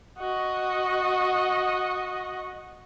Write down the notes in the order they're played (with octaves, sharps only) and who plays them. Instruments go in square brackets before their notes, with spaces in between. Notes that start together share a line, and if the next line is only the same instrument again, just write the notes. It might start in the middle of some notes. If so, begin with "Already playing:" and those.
[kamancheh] F#4 D#5